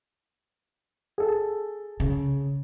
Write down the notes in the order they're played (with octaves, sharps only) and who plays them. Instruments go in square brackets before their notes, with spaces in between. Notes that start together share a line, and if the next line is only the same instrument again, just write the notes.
[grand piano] G#4 A4
[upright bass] C#3